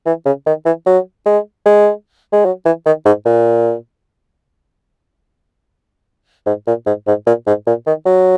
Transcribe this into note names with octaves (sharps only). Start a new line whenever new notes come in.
E3
C#3
D#3
E3
F#3
G#3
G#3
G#3
F#3
E3
D#3
G#2
A#2
G#2
A#2
G#2
G#2
A#2
G#2
A#2
D#3
F#3